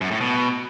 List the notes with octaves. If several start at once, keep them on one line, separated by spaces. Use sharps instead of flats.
F#2
A2
B2